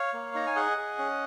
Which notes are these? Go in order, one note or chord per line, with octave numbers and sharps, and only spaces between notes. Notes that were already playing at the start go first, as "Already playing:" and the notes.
Already playing: C#5 F5
A#3
D#4 A#5
G#5
G#4 D#5 F#5
G#4
C#4